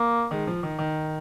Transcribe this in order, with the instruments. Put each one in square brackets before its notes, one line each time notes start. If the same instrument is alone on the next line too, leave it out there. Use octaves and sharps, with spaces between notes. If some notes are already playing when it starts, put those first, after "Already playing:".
Already playing: [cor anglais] A#3
[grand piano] D#3 G#3
F3
D#3
D#3